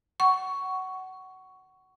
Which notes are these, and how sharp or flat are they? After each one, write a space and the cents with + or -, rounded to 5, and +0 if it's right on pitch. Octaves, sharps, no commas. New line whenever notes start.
F#5 +20 C#6 +10